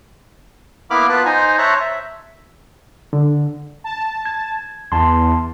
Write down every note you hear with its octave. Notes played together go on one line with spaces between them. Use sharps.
A#3 B3 E4 B5 D6 F6
B3 F4 B4 A5 F#6
D#4 C5 G#5 A#5
C5 C#5 E5 A5 A#5 F#6
E5
D3
A5
G#6
E2 A5 C6